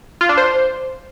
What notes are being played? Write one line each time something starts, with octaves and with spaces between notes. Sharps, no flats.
F4
D4
C5